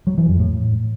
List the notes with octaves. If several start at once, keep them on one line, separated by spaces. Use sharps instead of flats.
F#3
E3
F2
A2